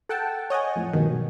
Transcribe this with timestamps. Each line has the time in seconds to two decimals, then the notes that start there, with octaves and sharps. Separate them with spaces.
0.09 A4 F#5 G5 A5
0.50 C#5 D#5 F#5 G#5
0.76 F2 A2
0.93 G2 B2 D#3
1.09 B1